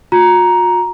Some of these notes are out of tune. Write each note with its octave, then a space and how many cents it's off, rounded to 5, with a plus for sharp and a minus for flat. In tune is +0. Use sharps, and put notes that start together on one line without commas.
F4 +45 A#5 +10